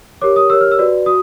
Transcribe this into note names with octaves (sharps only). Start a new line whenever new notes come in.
G4 A#4 C#5 D6
D#6
G4 A#4 C#5 E6
F6
E6
F#4 B4 D5
F#4 D#6